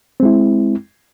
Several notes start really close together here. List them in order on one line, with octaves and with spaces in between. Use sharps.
C4 G#3 E4